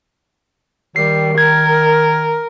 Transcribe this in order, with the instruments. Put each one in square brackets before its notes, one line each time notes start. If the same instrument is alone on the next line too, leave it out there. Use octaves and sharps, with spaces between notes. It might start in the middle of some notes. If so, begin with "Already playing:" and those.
[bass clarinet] D#3 [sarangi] G3 [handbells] C7
[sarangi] A#4 [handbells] G#6